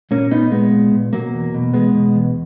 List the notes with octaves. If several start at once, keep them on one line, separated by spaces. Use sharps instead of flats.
A#2 A#3 C#4
A#2 B3 D#4
A#2 G#3 B3
A#2
A#2
B2 F#3 A#3
E2
B2
E2 G#3 B3
B2
E2